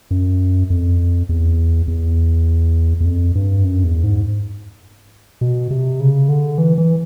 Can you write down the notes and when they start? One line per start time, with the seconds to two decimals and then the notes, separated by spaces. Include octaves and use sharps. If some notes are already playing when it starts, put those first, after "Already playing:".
0.11 F#2
0.70 F2
1.29 E2
1.88 E2
3.00 E2
3.05 F2
3.35 G2
3.64 F#2
3.84 E2
4.04 G#2
5.41 B2
5.71 C3
6.00 C#3
6.29 D3
6.58 E3
6.78 E3